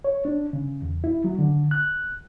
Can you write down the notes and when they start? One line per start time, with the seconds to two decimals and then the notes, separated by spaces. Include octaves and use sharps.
0.04 C#5
0.25 D4
0.53 C#3
0.82 E2
1.04 E4
1.24 F#3
1.39 D3
1.71 F#6